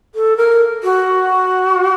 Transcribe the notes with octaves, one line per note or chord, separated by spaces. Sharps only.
A4
A#4
F#4